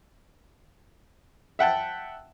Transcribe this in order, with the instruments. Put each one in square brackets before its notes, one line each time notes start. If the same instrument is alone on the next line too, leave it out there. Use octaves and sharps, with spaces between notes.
[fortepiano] E5 F#5 G5 A5